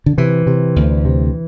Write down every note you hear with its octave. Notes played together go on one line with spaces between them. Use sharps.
D3
C3 E3
C3
D2
C3